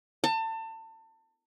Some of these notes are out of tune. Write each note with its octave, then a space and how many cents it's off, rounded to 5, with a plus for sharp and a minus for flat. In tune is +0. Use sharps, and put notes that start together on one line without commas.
A5 +30